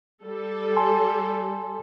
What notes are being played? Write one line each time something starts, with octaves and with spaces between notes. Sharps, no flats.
G3 A4
G#5 A5 C6